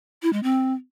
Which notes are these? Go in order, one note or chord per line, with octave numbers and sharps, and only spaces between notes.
E4
G#3
C4